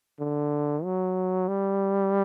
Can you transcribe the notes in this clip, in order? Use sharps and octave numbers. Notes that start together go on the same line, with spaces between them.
D3
F#3
G3